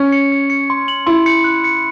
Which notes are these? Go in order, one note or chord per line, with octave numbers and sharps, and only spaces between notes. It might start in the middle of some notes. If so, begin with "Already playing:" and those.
Already playing: C#4
C#7
C#7
C#7
C6
F#7
E4 C6
C#7
F#6
C#7